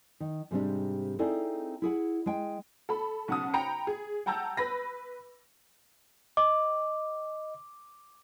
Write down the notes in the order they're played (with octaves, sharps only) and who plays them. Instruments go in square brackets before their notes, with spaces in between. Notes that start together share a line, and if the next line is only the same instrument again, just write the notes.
[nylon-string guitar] D#3
G#2 C3 G3 A#3 C4 D4
C4 D#4 E4 G#4 A4 D5
E4 G#4 F#5
G#3 G5
[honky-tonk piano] A4 B5
B1 C#3 F#5 A5 D#6
G5 A#5 B5 C#7
G#4
F#5 G5 A5 A#5 E6 G6
B4 B5 A#6
[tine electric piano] D#5 [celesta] D6